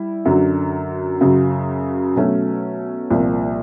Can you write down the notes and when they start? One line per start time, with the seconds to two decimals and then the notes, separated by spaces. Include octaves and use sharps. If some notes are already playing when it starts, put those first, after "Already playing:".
Already playing: G3 E4
0.25 F#2 D3 F#3
1.21 F#2 C#3 F#3
2.16 B2 F#3 A3 C#4
3.11 C2 A#2 F3